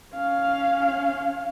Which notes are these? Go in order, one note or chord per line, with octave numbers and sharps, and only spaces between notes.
C#4 F5